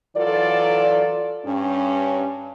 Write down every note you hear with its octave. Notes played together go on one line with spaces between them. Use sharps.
E3 F#3 F4 A4 D5
G2 C#4